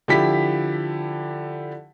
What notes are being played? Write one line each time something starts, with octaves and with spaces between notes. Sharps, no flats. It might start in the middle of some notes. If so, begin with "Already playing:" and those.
D3 F3 E4 G4 B6